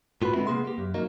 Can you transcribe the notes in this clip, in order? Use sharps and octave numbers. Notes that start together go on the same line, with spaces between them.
A2 F4 F#4 B4 B5
D3 G#3 B3 C4 E4
C3 A#3 B3 G#4 C6
A#3 G4
F#2
F#3 A#3 D#4